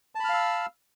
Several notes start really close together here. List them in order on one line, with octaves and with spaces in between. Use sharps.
A5 B5 F6 F5 E6